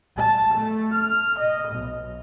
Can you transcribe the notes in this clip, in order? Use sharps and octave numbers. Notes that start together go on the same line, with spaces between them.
A5
A3
F6
D#5
B1